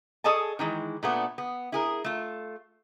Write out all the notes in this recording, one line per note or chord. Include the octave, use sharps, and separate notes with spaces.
G#4 A4 C#5 D#5 G#5 A5
D#3 E3 G#3
A#2 A3 B3 D4
B3
E4 G#4 A#4
A3 F4